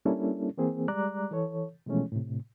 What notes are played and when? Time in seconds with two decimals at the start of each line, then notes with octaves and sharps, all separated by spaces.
0.05 G3 A#3 C#4 D4 E4 A4
0.57 E3 A#3 C4 G#4
0.88 G3 G#3 D5 A#5 D6 F#6
1.31 E3 A4 C#5
1.86 B2 E3 F3 G#3 A3 C#4
2.12 A2 C3